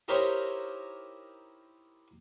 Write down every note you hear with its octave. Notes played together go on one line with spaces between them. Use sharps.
D#4 E4 G4 A#4 C5 C#5